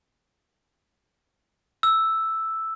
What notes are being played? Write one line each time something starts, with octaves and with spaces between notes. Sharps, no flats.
E6